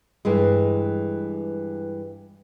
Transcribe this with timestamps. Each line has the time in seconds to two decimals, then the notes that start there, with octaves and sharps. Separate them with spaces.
0.25 G2 E3 G#3